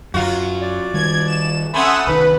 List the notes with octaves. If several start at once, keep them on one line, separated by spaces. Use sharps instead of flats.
F#2 F#3 F4 F#4
D5
D#3 G3 G#6
E7
A3 C#4 F#5 G#5 B5 C6 D#6 E6
C2 D#3 B4 B5